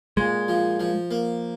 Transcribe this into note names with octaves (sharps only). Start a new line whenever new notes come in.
A#2 G#3
F3
F3
A#3